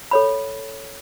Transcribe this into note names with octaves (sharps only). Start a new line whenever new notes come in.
A4 C#5 B5